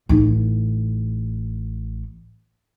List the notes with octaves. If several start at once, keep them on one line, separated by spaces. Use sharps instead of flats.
A1 D#4